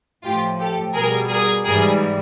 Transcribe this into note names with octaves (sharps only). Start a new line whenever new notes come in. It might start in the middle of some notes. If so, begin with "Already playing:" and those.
A2 F3 F4 G4
G4 A4
B2 G3 G#4 A#4
G#4 A#4
G#2 E3 G3 G#4 A#4